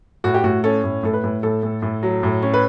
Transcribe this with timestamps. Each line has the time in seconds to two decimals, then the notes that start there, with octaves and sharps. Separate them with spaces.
0.24 A2 F#4
0.34 G4
0.44 A2 F#4
0.64 C#4 A4
0.84 A2
1.03 A2 A4
1.13 B4
1.24 A2
1.43 A2 A4
1.63 A2
1.82 A2
2.03 F#3
2.23 A2
2.43 C#4
2.54 B4